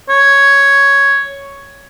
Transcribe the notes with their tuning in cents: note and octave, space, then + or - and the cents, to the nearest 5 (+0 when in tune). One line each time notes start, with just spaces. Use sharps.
C#5 +5